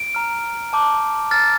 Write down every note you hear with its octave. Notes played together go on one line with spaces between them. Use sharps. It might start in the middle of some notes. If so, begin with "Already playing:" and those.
Already playing: D7
A#5 F6
A5 D6 G6
A#5 F6 A6